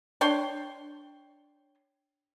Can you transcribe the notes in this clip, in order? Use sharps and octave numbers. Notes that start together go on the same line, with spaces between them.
D4 C#5 G5 C6